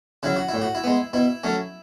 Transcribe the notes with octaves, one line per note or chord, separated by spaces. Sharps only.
C#3 F#3 E4
F#4
E4
A2
F#4
E4
G#3 B3
B2 E4
F#3 A3 C#4